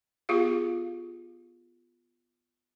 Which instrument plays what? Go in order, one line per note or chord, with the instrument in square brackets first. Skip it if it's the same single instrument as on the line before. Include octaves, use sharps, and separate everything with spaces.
[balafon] B3 F4 G4 G#4 F5